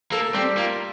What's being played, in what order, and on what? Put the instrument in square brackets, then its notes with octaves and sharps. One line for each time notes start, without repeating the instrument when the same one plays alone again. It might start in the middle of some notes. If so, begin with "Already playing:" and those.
[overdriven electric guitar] A#3 [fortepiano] A4
[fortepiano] G3 [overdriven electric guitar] C4
[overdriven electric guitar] A#3 [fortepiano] F4